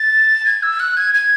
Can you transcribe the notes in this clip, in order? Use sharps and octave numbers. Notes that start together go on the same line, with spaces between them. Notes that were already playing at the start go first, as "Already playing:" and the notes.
Already playing: A6
G#6
E6
F#6
G#6
G#6